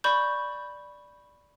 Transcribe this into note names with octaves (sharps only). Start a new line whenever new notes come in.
D5 B5 C#6 G6